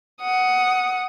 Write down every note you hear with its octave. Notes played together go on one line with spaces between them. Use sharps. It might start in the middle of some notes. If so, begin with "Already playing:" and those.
F#5 D#6